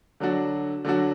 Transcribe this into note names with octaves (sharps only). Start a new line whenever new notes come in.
D3 F#3 D4 F#4
D3 F#3 D4 F#4